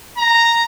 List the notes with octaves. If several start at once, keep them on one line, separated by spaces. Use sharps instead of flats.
A#5